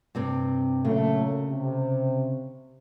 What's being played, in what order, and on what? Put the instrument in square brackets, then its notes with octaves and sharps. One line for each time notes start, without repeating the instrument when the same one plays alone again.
[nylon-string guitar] G2 C3 C4
[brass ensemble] A#2 F#3 A3 [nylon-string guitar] C#3 A#3
[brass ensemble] C3